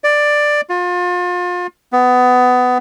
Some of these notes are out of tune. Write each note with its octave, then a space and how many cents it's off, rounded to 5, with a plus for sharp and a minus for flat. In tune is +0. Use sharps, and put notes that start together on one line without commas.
D5 +10
F4 +35
B3 +20